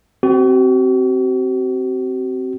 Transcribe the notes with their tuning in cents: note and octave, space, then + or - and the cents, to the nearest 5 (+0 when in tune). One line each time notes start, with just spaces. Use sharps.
C4 +0 F#4 +40